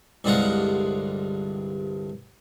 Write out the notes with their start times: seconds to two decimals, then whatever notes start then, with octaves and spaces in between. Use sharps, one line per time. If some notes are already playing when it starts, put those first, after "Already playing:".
0.24 C2 G2 D3 G#3 F4 F#5